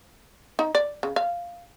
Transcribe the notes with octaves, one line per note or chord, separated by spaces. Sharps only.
D#4
D5
C#3
F5